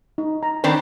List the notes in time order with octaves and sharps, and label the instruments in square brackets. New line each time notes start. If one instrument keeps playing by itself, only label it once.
[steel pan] D#4
A#5
[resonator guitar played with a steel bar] D#3 C4 D4 [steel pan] B4